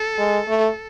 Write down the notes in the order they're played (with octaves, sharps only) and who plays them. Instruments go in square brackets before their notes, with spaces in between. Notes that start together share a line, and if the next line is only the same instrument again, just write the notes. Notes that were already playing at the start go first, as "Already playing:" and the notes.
Already playing: [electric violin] A4
[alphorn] G#3
A3